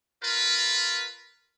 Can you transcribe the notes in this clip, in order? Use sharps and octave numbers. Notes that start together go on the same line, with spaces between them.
F4 A#4 B4